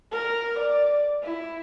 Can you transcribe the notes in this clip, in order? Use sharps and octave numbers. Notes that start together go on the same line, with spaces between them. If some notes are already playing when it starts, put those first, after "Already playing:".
A#4
D5
E4